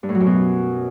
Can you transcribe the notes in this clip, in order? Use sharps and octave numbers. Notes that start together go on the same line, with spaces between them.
G2
A2
F#3
F#2
B2